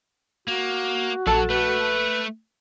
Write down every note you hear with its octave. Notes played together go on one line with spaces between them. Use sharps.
A#3 F#4
A#1 F#3 A4 A5
A3 B4